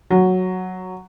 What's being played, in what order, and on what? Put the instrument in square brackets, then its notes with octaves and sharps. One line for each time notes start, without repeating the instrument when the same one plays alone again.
[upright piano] F#3